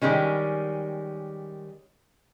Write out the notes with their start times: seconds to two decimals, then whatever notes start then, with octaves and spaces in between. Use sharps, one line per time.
0.02 D#3 G3 G#3 C#4